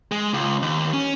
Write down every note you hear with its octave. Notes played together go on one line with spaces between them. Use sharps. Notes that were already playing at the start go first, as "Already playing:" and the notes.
G#3
C#2
D#2
C#4